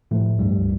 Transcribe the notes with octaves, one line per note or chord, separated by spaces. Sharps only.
A2 F3 A3
C#2 G2 G3